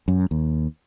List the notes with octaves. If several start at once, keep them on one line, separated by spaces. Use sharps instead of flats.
F#2
D#2